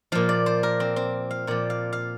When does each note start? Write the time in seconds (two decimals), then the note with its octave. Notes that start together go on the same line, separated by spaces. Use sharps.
0.12 A#2 F3 F5
0.29 D5
0.46 C5
0.63 A#4
0.80 C4
0.96 C4
1.31 F5
1.47 A#2 F3 D5
1.70 F5
1.93 F5